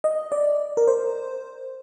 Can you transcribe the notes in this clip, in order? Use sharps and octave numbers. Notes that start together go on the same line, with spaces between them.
D#5
D5
A#4
C5